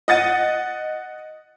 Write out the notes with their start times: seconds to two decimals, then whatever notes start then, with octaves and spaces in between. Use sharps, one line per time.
0.08 D#5 F#5 A6 D#7